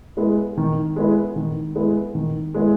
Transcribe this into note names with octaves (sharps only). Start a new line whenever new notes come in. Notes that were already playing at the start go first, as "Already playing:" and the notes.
G#3 B3 E4
D#3
G#3 B3 E4
D#3
G#3 B3 E4
D#3
G#3 B3 E4